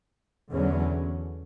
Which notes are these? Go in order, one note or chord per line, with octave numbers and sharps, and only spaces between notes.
E2 D3 F#3 C#4